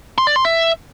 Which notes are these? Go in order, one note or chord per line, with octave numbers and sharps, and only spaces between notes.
C6
D5
C6
E5